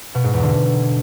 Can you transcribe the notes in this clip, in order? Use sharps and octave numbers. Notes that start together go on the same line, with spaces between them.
B2
G#2
E2
D3